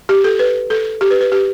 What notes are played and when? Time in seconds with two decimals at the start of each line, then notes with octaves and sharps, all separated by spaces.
0.09 G4
0.24 A4
0.39 B4
0.70 A4
1.01 G4
1.10 B4
1.21 B4
1.32 G4